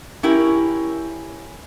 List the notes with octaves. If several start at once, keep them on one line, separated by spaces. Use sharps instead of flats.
C#4 E4 G4 A#4